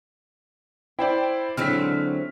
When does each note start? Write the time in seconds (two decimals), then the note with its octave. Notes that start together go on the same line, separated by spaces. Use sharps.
0.99 E4 C5 D5 G5
1.57 D3 F#3 G#3 C4 E4 F6 B6